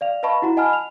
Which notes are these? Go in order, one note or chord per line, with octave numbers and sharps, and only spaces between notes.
D5 F5 F7
B4 D#5 F5 A5 B5 C#6
E4 F#4 F#5 A#5
D#5 F#5 G#5 A5 B5 F6
F7